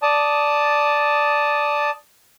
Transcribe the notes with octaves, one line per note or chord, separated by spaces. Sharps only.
D5 A5 D#6